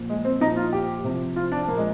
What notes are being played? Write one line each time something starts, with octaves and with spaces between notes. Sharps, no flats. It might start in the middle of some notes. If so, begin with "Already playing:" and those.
Already playing: A#2 F3
G#3
C4
A#2 F3 D#4
F4
G4
C3 F3
F4
D4
A#2 F3 A#3
G#3